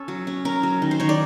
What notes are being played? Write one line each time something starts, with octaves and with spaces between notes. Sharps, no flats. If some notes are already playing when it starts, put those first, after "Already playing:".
Already playing: C#4 A4
F#3
C#4
C#4 A#4
F#3
D#3
C5
D#3 C#5
D5